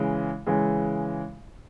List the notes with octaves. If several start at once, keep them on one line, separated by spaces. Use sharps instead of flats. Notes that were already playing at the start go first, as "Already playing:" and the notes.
Already playing: C#3 E3 G#3
C#3 E3 G#3